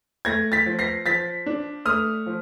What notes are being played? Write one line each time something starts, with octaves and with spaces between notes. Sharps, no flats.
A3 G#6 A#6
A6 B6
F3
A#6 C7
F3 A6 B6
D4
A3 D#6 F6
F3